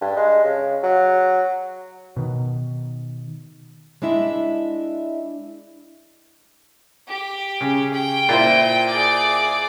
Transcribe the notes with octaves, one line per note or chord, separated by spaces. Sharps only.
G2
G#3
C#3
F#3
B2 D#3
G#3 D4 E4 E5
G4
C#3
G5
A#2 E4 C5
G#4 D5